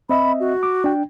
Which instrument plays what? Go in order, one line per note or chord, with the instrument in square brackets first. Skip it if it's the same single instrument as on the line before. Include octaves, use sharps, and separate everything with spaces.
[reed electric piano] C4 D#5 E5 [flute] B5
[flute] F#4
[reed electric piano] D6
D4 G5